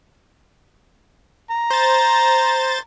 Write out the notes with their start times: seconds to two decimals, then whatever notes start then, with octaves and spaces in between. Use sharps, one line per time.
1.50 A#5
1.71 C5 A6